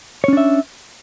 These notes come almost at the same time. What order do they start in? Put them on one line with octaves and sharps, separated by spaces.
C#5 C#4 D4 E5